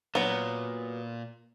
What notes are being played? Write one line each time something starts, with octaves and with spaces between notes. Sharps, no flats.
A#2 F#3 B3